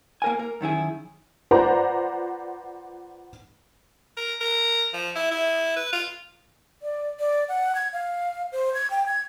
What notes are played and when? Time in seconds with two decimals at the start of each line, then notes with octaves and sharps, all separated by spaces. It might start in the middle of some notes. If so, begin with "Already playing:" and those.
0.22 A#3 A#4 G#5
0.39 A#4
0.61 F#2 D#3 E4 G#4
1.51 F4 B4 C5 D5 F#5 A#5
4.17 A#4
4.41 A#4
4.94 F3
5.15 E4
5.31 E4
5.76 B4
5.93 F4
6.82 D5
7.20 D5
7.49 F#5
7.75 G#6
7.93 F5
8.52 C5
8.74 G#6
8.91 G5
9.06 G#6